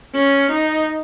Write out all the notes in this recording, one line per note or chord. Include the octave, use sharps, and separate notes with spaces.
C#4
D#4